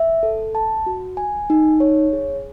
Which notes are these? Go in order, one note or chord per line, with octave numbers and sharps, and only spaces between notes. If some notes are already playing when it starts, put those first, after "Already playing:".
Already playing: E5
A4
A5
F#4
G#5
D#4
C#5
G#4